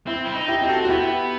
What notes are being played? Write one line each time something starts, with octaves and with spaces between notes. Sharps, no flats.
C4 E4
E4
D#4
E4 G4
C4 G4
F#4 A4
F#4
B3 E4 G4